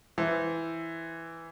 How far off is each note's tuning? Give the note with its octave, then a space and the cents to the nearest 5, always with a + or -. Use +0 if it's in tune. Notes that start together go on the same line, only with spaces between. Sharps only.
E3 +0 C5 +0